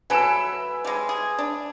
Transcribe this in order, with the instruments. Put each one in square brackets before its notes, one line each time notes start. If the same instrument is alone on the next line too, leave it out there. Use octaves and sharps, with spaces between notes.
[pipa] F#3 A4 [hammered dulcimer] B4 E5 [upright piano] G#5 D7 E7
[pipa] G3 G#3
G#4
D4